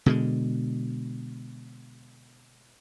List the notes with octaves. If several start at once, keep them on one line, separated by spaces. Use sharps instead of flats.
B2 D3 G#3